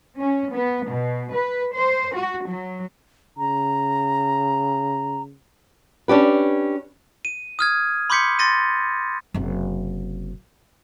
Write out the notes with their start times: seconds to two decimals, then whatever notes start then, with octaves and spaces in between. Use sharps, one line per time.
0.18 C#4
0.53 B3
0.89 B2
1.33 B4
1.73 C5
2.14 F#4
2.46 F#3
3.38 C#3 A#5
6.08 C#4 D4 G4 B4
7.25 D#7
7.59 D#6 F6 G#6
8.10 B5 C6 D6 G6 B6 C#7
8.39 C6 A6 A#6 D#7
9.34 F#1 C3